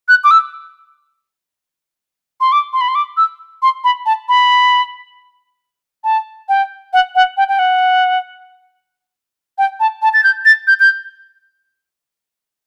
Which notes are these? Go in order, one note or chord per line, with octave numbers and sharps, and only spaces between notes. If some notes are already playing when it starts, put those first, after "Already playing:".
F#6
D6
E6
C6
D6
C6
B5
C6
D6
E6
C6
B5
A5
B5
A5
G5
F#5
F#5
G5
G5
F#5
G5
A5
A5
A6
G6
A6
G6
G6